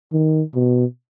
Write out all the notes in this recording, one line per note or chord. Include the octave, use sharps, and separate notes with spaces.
D#3
B2